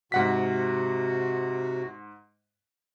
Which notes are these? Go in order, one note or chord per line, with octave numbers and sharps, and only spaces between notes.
G#2 C3 F#4 F#5 B6